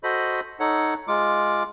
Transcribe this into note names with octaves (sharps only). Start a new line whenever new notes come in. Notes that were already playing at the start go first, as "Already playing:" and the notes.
F#4 A4 C5 D#5 B5
D#4 A4 C#5 F#5
G#3 F4 D6